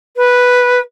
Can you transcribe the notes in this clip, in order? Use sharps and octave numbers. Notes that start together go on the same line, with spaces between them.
B4